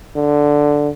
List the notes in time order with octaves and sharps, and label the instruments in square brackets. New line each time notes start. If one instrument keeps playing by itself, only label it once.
[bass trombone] D3